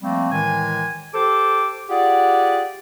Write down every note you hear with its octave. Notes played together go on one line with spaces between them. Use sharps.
F3 G3 A3 A#3 C4
A2 D#3 E3 G#3 G#5
G4 A4 C5 D6
F4 G4 G#4 D5 F#5